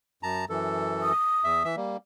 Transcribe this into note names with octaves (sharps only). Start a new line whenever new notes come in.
F#2 A5 A#5
F#2 E3 A4
D#6
E2 E5
E3 E5
G3 A#3